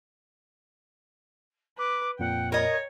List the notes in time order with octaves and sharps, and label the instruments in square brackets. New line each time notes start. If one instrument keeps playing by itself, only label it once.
[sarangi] B4 [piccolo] D6
[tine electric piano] F2 A#2 [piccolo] F#5 [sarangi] G5
[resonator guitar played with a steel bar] A#4 D#5 [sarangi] C#5 [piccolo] G#6